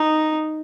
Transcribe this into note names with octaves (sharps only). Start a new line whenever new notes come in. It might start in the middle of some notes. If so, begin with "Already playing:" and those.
Already playing: D#4